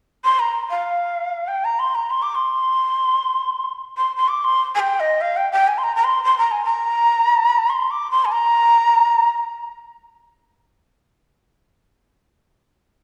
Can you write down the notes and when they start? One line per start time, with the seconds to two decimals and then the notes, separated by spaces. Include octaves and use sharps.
0.24 C6
0.39 A#5
0.70 F5
1.48 G5
1.64 A#5
1.79 C6
1.95 A#5
2.10 C6
2.22 D6
2.35 C6
3.97 C6
4.17 C6
4.28 D6
4.44 C6
4.75 G#5
4.80 G5
5.00 D#5
5.21 F5
5.37 G5
5.52 G5
5.68 G#5
5.78 C6
5.83 A#5
5.96 A#5
6.04 C6
6.24 C6
6.38 A#5
6.51 G#5
6.65 A#5
7.69 C6
7.91 D6
8.11 C6
8.25 G#5
8.32 A#5